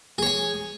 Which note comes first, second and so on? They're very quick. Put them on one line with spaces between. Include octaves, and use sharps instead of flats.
G#4 C#5 G#5